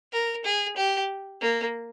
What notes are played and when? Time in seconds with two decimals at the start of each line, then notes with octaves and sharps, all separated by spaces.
0.12 A#4
0.44 G#4
0.76 G4
1.41 A#3